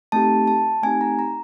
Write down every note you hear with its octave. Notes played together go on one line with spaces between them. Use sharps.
A3 C4 D#4 G4 A5
A5
A3 C4 D#4 G4 G#5
A#5
A#5